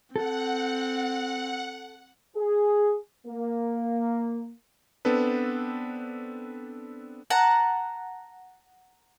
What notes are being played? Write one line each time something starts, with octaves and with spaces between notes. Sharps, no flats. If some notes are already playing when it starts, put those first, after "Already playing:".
C4 A4 F#5
G#4
A#3
B3 C4 D4 A4 B4
F#5 A5 A#5